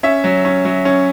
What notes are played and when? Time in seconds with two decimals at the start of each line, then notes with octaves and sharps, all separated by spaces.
0.03 C#4 E5
0.24 F#3
0.45 C#4
0.65 F#3
0.85 C#4